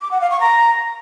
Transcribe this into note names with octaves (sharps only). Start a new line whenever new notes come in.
D6
F#5
F5
C#6
A#5